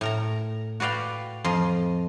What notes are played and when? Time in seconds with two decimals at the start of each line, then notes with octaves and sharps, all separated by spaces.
0.01 A2 A#4 A#5
0.80 F#4 B4 D5 F5 G5
1.44 F2 F4 D#5 C6